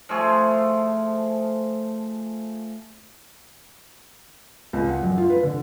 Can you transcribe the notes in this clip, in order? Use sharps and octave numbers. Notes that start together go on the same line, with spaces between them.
F3 A3 G#4
C#2
F#5
F#2
F4
B4
D3